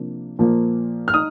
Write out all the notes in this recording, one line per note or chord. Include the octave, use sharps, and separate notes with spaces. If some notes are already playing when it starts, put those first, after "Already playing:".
Already playing: C3 F3 A#3 D4
A#2 F3 A#3
F6
D#4 D#6